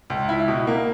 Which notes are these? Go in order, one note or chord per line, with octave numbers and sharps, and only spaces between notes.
C#2
E4
B2
A#3